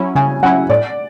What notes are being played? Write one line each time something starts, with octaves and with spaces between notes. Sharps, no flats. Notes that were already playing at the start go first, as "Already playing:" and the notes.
Already playing: F#3 C#4 E4
C#3 G#5
F#3 C#4 E4 F#5
A2 D5